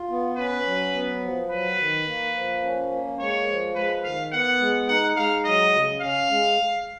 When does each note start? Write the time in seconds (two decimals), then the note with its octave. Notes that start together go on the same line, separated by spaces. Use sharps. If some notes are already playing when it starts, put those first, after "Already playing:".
Already playing: F4
0.09 B3
0.37 C#4 B4
0.65 F#3
0.93 B3
1.22 F3
1.50 F#3 B4
1.78 D#3
2.06 A#3
2.35 F3
2.63 C#4
2.91 A#3
3.19 G#3 C#5
3.47 F3
3.75 G#3 B4
4.03 D#3 F5
4.32 B3 F#5
4.60 G#3
4.88 D#4 F#5
5.16 G#3 F5
5.45 F#3 D#5
5.73 C#3
6.01 C#4 F5
6.29 G#3